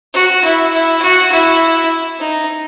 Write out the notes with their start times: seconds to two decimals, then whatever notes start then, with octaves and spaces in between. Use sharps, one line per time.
0.14 F#4
0.44 E4
0.73 E4
1.02 F#4
1.32 E4
2.20 D#4